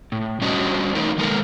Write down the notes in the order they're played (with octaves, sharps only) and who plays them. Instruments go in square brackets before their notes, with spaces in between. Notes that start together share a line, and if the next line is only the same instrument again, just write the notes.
[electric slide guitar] A2
G3 C#4 D4 F#4 C5 D#5
E3 A3 D#4 A#4
D#3 G#3 B3 A4 A#4